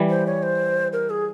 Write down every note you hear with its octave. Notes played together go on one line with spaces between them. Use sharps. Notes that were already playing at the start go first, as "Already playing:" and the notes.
Already playing: E3 G3
C5
C#5
C5
A#4
G#4